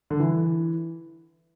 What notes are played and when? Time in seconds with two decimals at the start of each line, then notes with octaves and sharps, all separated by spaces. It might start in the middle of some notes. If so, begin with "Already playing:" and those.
0.10 D3
0.20 E3